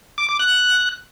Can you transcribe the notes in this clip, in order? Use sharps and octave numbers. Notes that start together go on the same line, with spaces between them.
D6
D6
F#6